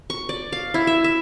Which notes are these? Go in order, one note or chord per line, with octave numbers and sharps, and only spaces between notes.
C#6
D5
F5
E4
E5
E5